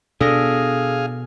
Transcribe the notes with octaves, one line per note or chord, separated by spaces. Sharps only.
B2 B3 D4 G#4 A4 F5 D#6 A#6